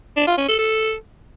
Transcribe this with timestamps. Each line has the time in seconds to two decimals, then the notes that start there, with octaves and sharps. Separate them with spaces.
0.17 D4
0.27 F4
0.38 C#4
0.48 A4
0.59 A4